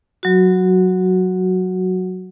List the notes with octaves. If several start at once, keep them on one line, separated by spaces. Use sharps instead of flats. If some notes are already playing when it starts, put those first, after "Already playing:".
F#3 F#4